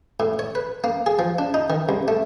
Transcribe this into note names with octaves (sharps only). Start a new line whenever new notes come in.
A2
C#5
B4
A#3
G#4
F3
D4
D#4
D#3
C2
A3